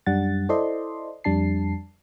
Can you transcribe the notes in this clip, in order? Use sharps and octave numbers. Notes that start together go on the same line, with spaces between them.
F#2 G3 D4 F#5 A6
E4 A4 C5 D5 D#5 C6
F2 G3 D4 A5 C7